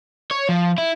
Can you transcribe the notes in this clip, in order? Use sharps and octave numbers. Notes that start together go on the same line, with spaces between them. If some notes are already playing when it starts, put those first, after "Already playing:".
C#5
F3
E4